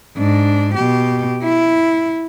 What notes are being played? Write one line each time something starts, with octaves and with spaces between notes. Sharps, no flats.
G#2 D4
B2 G4
E4